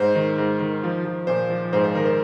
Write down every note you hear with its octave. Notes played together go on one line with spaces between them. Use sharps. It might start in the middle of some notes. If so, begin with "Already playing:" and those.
Already playing: G#2 C5
D#3
G#2
D#3
F3
F3
A#2 C5
F3
G#2 C5
C5
D#3 A#4
C5